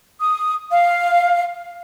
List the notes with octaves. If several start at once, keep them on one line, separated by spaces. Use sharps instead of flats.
D#6
F5